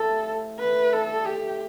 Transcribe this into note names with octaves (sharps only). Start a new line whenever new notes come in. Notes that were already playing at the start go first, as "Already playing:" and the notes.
Already playing: A2 G3 C4 F4 A4
F3 C4 F4
E3 A3 E4 B4
D3 G3 D4 A4
A2 F3 C4 G4